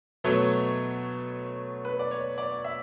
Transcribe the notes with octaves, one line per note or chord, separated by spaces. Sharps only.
B2 F#3 A3 C#5
B4
D5
C#5
D5
E5